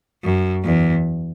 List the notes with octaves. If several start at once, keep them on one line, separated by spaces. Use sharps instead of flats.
F#2
E2